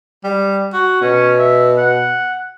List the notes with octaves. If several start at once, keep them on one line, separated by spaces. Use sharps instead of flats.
G3
F#4
B2 C#4
E5
F#5